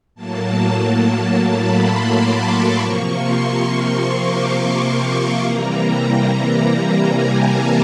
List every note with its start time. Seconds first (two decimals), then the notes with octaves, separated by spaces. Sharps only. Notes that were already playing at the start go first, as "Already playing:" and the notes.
0.15 A2 F#3 A#3 A5
1.47 B5
1.80 C6
2.12 D6
2.46 C#6
2.79 C3 F3 A#3 C#6
3.11 C6
4.10 D6
4.42 C#6
4.75 C6
5.08 C6
5.42 C3 E3 G3 A#3 A#5
7.07 G#5
7.39 A5